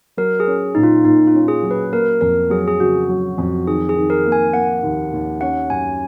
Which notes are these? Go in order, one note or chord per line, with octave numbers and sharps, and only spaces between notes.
F#3 A#4
G#4
C#4
A#2 D#4
F4
A#2 D#4
F4
C#4
G#4
F#3
B4
A#3 A#4
F2 A#4
F#3 G#4
G#4
C#3 F#4
F#3
F2
D#3 G#4
G#4
D#3
A#4
A#3
G#5
A#3 F#5
D#2
D#2
C#4 F#5
F#2 G#5